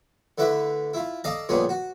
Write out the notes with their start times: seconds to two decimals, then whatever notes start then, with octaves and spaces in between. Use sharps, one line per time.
0.38 D3 A3 E4 B4
0.94 E4 F4
1.24 A4 D5 D#5 F5 A#5
1.49 A#1 C#3 G3 A3 B3 G#4
1.69 F#4